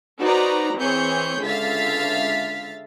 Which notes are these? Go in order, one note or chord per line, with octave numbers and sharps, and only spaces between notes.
D#4 F#4 B4 C5 D5 A#5
E3 C4 G#4 C#5 G6 C#7
C#2 D3 E5 F5 A6 B6